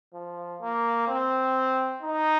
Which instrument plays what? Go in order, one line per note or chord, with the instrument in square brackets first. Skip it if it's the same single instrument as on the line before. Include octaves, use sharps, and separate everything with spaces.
[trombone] F3
A#3
C4
D#4